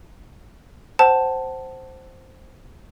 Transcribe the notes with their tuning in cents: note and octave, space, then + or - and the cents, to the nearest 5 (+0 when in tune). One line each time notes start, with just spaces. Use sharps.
C5 +0 F#5 +30 A5 +0